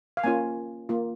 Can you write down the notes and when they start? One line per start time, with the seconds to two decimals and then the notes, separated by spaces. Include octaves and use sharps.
0.17 F5
0.24 A#3 C#4 F4 G#5
0.89 A#3 F4